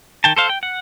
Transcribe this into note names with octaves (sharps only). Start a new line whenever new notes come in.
D#3 G5 A5
A4 C5 F5
G5
F#5